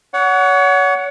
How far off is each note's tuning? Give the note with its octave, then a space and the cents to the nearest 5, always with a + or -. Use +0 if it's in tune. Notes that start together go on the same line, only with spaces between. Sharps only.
C#5 +35 F#5 +0